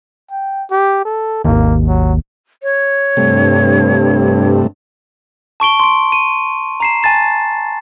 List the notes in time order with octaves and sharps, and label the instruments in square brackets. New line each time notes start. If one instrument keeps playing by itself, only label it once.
[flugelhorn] G5
G4
A4
[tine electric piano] G#1 D#2 [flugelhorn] A#3
[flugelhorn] F#3
[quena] C#5
[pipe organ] G2 [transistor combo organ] C3 G3 A3
[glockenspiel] A5 C#6 D7 G7
C6 D7
D#7
A#5 C7 E7
G#5 A5 A6 E7